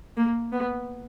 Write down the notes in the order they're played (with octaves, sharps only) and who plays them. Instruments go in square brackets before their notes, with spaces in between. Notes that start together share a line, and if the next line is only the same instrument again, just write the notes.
[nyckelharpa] A#3
B3